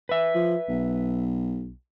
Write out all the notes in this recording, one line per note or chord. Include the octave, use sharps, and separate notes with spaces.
B4 E5
F3
B1